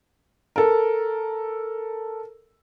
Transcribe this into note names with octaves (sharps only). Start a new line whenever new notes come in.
A4 A#4